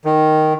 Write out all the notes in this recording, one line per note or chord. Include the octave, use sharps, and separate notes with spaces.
D#3